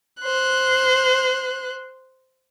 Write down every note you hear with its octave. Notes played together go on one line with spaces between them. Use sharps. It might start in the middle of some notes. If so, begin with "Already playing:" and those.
C5 F#6